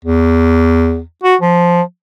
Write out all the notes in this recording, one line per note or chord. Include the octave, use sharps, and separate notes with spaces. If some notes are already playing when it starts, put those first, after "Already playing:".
E2
F#4
F3